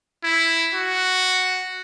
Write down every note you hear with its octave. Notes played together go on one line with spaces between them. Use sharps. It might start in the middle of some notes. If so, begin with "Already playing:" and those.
E4
F#4